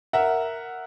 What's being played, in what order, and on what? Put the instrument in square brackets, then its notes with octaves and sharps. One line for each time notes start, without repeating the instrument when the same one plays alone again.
[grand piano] A#4 E5 F#5